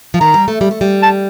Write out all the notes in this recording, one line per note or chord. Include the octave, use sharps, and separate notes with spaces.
F3
D#3 A#5
G3
A3
G3
A3
G3
A5